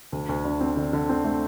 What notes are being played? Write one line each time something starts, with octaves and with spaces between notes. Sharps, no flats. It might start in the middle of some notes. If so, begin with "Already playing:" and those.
D2
D2
D3
C4
D3
D3
C4
A3